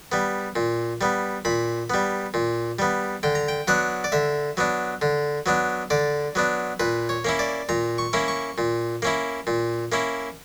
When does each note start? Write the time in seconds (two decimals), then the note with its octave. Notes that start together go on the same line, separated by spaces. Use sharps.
0.12 G3 B3
0.56 A#2
1.01 G3 B3
1.45 A#2 B5
1.90 G3 B3
2.34 A#2
2.79 G3 B3
3.23 D3 G5
3.35 A#5
3.48 G5
3.68 F#3 B3 D4 F#5
4.04 D5
4.12 D3 E5
4.57 F#3 B3 D4
5.02 D3
5.46 F#3 B3 D4
5.90 D3 D5
6.35 F#3 B3 D4
6.80 A#2 B4
7.09 C#5
7.25 A#3 C#4 E4
7.39 D5
7.69 A#2 A#5
7.98 C#6
8.13 A#3 C#4 E4
8.28 C#6
8.58 A#2
9.02 A#3 C#4 E4
9.47 A#2
9.92 A#3 C#4 E4